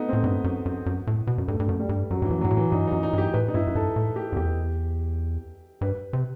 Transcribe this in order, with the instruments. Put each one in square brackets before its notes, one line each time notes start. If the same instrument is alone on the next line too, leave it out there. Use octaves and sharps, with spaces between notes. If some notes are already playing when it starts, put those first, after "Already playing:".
Already playing: [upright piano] A3 B3 D#4
[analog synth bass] A2 [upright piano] C4
[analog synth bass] G2 [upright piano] B3
[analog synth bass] F#2
F#2
F#2
A2
B2
F#2
[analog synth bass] G2 [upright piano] A3
[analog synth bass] G2
F#2
[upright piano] G3
[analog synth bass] G2
[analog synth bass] F#2 [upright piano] F#3
[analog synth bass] G2 [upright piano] E3
[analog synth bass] F#2
[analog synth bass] G2 [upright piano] F#3
[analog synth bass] A2
[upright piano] E3
[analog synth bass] G2 [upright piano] D#4
[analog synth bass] F#2 [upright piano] D#4
[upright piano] D#4
[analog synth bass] G2 [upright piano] G4
[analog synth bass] A2 [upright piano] B4
[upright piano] D#4
[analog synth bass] G2 [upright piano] E4
[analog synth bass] F#2
[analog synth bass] G2 [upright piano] A4
[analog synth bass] A2
[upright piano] G4
[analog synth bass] F#2
[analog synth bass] E2 [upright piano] G4
[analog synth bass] G2 [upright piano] B4
[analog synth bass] C3